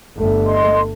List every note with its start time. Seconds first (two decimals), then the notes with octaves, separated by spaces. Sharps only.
0.17 G1 A3
0.46 D#5 C6